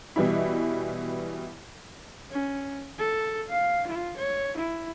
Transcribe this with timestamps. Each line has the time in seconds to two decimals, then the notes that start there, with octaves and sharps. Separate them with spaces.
0.16 B2 E3 G3 E4
2.30 C#4
2.99 A4
3.49 F5
3.87 F4
4.17 C#5
4.57 E4